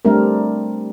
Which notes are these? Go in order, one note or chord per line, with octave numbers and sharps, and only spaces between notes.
G3 A3 C4 D4 A#4